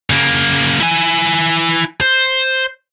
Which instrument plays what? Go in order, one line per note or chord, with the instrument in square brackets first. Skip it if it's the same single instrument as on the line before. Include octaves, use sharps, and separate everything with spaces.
[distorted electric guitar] C#3 A#3
E4 G#5
C5